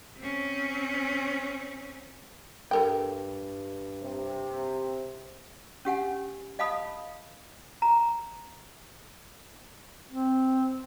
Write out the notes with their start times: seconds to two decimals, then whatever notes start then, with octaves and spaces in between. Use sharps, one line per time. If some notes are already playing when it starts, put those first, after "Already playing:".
0.18 C4 C#4
2.71 G2 A4 A#4 G5
4.02 C3
5.85 C#4 G4 F#5 G#5
6.59 D#5 F5 A5 B5 D#6
7.82 A#5
10.08 C4